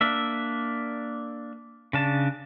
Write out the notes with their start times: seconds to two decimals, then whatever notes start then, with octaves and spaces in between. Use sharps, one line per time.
0.01 A#3 D4 E5
1.93 C#3 D4 A5